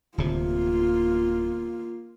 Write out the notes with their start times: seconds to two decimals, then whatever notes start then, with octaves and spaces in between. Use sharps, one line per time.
0.18 D1 C3 A#3 F4